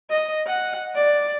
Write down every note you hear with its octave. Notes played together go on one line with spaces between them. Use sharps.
D#5
F#5
D5